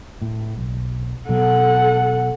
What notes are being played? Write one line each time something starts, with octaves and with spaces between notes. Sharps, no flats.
A2
B1
B2 F#3 A4 F#5